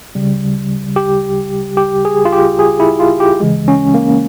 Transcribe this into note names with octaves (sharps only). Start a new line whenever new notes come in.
C#3 G3
G4
G4
G#4
F4
G4
G#4
E4
F4
G4
C#3 E3 G#3
C#4
A#3